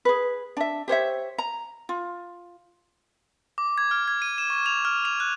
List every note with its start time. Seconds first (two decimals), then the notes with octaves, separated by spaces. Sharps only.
0.05 G#4 B4
0.57 D4 E5
0.88 G4 C5 C#5 E5
1.38 A#5
1.89 F4
3.58 D6
3.78 G#6
3.91 F6
4.08 G#6
4.22 D#7
4.38 E7
4.50 C#6
4.66 F7
4.85 F6
5.05 F7
5.20 F#6